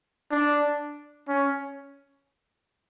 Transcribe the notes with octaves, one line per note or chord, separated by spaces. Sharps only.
D4
C#4